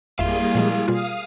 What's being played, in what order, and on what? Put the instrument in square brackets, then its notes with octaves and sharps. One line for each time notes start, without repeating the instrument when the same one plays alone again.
[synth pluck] G#1 F2 E5 [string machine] G3 A#3 G#4 [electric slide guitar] E4 F5
[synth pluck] A#2 F3 G#3
[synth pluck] B2 G3 F4 [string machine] F5 D#6